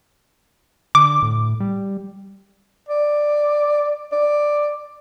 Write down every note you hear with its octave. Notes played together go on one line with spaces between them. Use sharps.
D3 D6
A2
G3
D5
D5